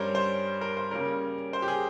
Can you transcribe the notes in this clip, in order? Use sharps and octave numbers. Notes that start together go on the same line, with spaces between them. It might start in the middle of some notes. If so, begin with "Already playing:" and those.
Already playing: G2 G3 C#4 A#4 C5 C#5
C5
A#4
C5
C#3 G3 A#3 C#4 A#4
C5
G4
G#4